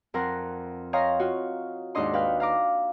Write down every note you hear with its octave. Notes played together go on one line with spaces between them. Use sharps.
F2 A#4 F#5 C6
C#5 D#5 F5 G5 A#5 C6
F4 F#4
D#2 G#2 D4 D#4 D#5 C6
B4 F5 G5
F5 A#5 D6